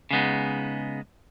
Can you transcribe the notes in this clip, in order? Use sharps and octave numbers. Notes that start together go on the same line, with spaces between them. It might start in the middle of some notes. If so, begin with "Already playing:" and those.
C#3 G#3 B3 D#4